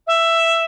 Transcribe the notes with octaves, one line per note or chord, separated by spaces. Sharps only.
E5